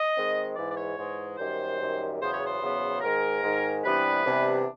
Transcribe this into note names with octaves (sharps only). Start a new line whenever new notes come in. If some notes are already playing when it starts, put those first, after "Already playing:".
Already playing: D#5
D#3 G#3 C4
G#2 E3 G#3 D5
D5
C#5
G#2 E3 G#3
F#2 D#3 G3 C5
F#2 D#3 G3
E2 C#3 F#3 B3 C5
C#5
C5
E2 C#3 F#3 B3
G#2 D#3 G#3 A#4
G#2 D#3 G#3
C3 E3 G3 B3 D4 B4
C3 E3 G3 B3 D4